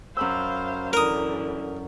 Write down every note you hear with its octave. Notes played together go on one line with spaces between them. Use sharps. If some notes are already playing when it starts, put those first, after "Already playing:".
F#2 C5 F5 B5 E6
D3 E3 A#4 D#6